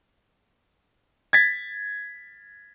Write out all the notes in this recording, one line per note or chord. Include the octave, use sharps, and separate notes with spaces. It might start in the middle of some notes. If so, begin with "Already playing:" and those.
G#6 A6 B6